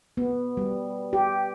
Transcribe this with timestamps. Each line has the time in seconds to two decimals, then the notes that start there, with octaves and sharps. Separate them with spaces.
0.17 B3
0.57 G3
1.13 G4